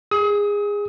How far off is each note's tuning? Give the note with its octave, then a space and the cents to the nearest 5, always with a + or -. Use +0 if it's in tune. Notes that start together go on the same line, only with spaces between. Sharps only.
G#4 -20 D#6 +35